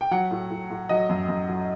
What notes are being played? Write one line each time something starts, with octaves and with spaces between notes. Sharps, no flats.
G5
F#3 F#5
A2
A2
A2
F#3 D#5
F#2
F#2
F#3